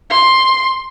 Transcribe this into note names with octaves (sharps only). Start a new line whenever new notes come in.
C6